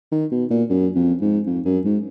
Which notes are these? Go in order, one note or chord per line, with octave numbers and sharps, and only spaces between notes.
D#3
B2
A#2
F#2
F2
G#2
F2
F#2
G#2